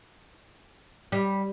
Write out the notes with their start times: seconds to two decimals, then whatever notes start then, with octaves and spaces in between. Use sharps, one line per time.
1.12 G3